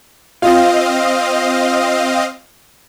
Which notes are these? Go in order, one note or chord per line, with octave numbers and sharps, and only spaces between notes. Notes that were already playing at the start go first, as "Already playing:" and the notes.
C4 F4 D#5 F5